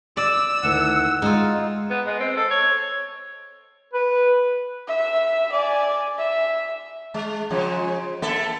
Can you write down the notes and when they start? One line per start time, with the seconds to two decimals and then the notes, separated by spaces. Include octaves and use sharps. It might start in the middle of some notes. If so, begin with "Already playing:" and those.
0.17 D5 E6
0.63 D2 D#3 E4 F#5
1.22 G#3 D#4 F4
1.91 B3
2.06 G#3
2.20 C4
2.37 A4
2.51 C#5
3.94 B4
4.87 E5
5.52 D5 G#5
6.18 E5
7.14 G#3
7.50 C#3 F3 G#3
8.22 A#3 A4 E5